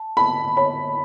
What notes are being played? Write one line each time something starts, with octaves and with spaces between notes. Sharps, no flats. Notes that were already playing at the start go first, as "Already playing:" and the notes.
Already playing: A5
A5 B5
C#5 B5